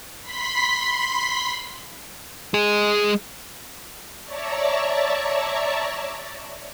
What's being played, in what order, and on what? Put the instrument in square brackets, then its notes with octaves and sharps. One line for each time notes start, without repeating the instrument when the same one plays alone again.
[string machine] B5 C6 B6
[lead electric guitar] G#3 G#4
[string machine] C#5 D5 E5 A5 A#5 C#6